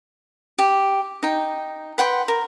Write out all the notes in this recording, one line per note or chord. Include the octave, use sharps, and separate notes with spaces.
G4
D#4 G5
B4 F#5 G5 C6
A#4